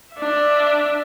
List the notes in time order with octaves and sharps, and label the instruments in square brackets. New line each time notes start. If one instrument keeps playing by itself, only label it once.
[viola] D4 E5